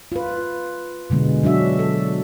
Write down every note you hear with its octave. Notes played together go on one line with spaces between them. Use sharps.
F4 B4
B2 D3 G#3 B3
F#3 D4 F#4 E5
A4